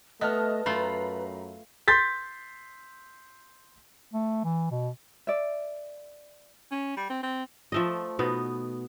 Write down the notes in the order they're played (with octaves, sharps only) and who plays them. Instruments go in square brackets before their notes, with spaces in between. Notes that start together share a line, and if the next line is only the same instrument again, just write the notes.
[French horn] A3 [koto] B3 [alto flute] B4 [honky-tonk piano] D#5 A5 F6
[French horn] F#2 [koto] A3 F4 [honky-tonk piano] A#5 B5 C7
[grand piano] C6 G6 A6 B6
[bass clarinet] A3
E3
B2
[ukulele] D5 E5
[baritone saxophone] C#4
G3
C4
C4
[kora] F3 A3 D#5
B2 B3 D#4